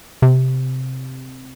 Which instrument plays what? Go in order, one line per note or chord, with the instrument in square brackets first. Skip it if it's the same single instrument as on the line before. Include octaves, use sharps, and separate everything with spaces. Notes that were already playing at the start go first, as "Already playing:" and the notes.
[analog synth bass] C3